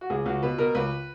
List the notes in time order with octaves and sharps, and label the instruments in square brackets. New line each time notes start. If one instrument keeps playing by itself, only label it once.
[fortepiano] F#4
C#2 G#4
C#2 F#4
B2 B4
B2 A#4
C#2 B4